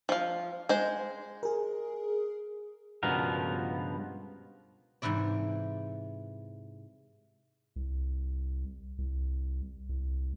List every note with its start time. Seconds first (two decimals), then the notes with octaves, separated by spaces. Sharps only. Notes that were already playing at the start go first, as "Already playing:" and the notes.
0.09 F3 F5
0.69 G#3 C5
1.43 G#4 A#4
3.03 C#2 G2 B2 F3 B3 A#4
5.02 G#2 C3 E3 E4 D5
7.76 C2
8.98 C2
9.89 C2